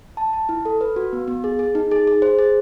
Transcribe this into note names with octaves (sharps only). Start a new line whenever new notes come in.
A5
A5
E4
A4
B4
F#4
B3
B3
G#4
G#4
D#4
G#4
G#4
C5
G#4